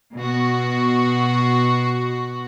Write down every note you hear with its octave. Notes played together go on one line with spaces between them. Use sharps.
B2 F#4